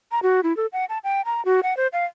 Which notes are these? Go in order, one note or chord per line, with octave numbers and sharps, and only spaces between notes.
A#5
F#4
E4
A4
F#5
A5
G5
A#5
F#4
F#5
C5
F5